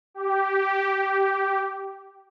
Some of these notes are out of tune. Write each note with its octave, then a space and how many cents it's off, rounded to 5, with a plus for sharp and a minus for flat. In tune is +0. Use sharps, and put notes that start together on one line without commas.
G4 -10